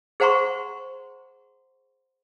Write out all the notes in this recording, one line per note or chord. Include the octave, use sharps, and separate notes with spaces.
G#4 C5 F#5 A#5 C6 C#6